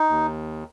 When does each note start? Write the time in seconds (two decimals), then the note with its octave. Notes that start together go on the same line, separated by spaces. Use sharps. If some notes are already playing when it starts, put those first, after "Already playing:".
Already playing: D#4
0.09 D#2